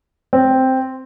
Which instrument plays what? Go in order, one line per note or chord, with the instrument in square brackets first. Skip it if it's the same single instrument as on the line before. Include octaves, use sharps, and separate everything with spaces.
[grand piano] C4